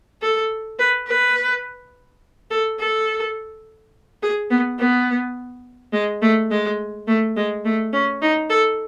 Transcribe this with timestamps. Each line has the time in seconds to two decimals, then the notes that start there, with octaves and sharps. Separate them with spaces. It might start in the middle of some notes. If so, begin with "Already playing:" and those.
0.22 A4
0.79 B4
1.08 B4
2.51 A4
2.80 A4
4.23 G#4
4.51 B3
4.79 B3
5.93 G#3
6.22 A3
6.51 G#3
7.08 A3
7.36 G#3
7.65 A3
7.93 C#4
8.22 D#4
8.50 A4